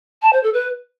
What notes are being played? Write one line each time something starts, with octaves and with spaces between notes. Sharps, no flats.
A5
C5
A4
B4